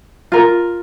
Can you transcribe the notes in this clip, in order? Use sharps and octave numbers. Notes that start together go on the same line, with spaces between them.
F4 A#4